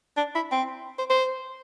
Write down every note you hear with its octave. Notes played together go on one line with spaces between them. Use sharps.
D4
E4
C4
C5
C5